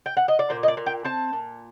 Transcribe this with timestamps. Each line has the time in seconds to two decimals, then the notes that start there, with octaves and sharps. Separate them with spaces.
0.06 G5
0.17 F#5
0.28 D#5
0.39 D5
0.50 A#2 C5
0.63 D#5
0.68 D5
0.77 A#2
0.86 G5
1.05 C4 A5
1.33 A#2